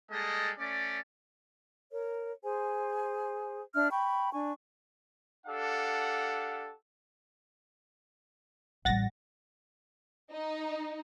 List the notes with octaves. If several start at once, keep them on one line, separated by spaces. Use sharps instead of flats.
G3 G#3 A#3 A4 D#5
A3 C#4 D5
A#4 C#5
G#4 C5 G#5
D4 E5 F6
G5 B5 C#6
D4 G#5 C#6
D4 G4 A4 F5 F#5
A1 G3 F#5 A6 A#6
D#4